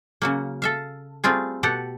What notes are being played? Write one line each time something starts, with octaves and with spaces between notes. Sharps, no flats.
C#3 F#3 A#3
A4 E5 F5
G3 A3 C4 F4 G#4
B2 G4 A4 F#5